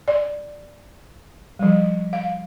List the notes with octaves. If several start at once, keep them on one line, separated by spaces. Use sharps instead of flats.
D5
F3 G3
F5